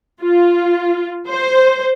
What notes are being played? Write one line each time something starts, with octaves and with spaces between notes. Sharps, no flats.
F4
C5